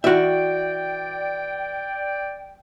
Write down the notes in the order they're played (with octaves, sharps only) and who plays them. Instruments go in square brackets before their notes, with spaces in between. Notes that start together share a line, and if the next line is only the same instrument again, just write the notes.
[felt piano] E3 [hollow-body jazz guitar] F#4 E5 [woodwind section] D5 G5